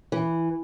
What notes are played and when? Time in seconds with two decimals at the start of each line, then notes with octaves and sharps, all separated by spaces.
0.12 E3